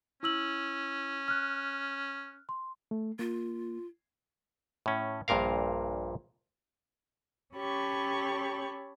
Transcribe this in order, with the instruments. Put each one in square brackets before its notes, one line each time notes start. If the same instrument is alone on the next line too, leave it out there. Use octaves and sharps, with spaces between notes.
[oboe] C#4 [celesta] E4 E6 F#7
[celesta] F6 F#6
C6
[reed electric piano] A3
[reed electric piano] A#3 [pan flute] F4
[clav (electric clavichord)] A2 C#4
A#1 G2 A#2 A#4 F5
[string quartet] C#4 G4 A4 C#5 B5 C#6